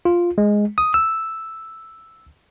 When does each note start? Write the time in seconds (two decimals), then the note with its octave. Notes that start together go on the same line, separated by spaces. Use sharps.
0.05 F4
0.38 G#3
0.78 D#6
0.94 E6